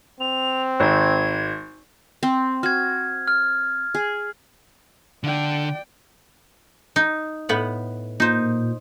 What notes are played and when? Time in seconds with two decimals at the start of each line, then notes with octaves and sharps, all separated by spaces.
0.20 C4 F7
0.80 G#1 G#6
2.23 C4
2.63 F#4 F6 G#6
3.28 F6
3.94 G#4
5.24 D3 D5 G5
6.96 D#4
7.49 A2 B3 F#5
8.20 A#2 D#4 C5